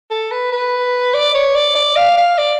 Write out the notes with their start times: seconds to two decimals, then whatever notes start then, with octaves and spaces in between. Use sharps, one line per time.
0.11 A4
0.31 B4
0.52 B4
1.14 D5
1.34 C#5
1.55 D5
1.75 D5
1.97 F5
2.17 F5
2.38 D5